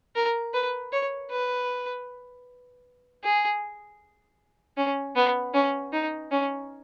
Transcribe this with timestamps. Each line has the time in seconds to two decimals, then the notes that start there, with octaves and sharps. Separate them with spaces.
0.15 A#4
0.54 B4
0.92 C#5
1.30 B4
3.24 G#4
4.77 C#4
5.16 B3
5.54 C#4
5.93 D#4
6.31 C#4